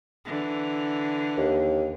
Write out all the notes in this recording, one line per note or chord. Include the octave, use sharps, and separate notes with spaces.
D3 E3
D#2